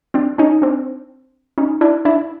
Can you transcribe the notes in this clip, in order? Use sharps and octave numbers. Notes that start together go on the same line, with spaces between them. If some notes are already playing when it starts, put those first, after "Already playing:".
C4 D4
C#4 D#4
C4 D4
C#4 D#4
D4 E4
D4 E4